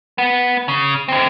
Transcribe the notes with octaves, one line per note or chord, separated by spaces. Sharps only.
B3
C#3
D3 C4